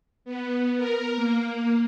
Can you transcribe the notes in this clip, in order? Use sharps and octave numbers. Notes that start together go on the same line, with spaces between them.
B3
A#4
A#3